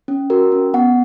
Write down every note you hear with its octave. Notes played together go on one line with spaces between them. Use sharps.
C#4
F#4 A#4
C#4
B3 F#5